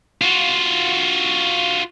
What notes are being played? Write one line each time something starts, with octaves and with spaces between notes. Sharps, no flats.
F4 F#4